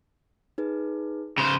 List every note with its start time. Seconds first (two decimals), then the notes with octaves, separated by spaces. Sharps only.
0.58 D#4 G#4 B4
1.38 C#3 C5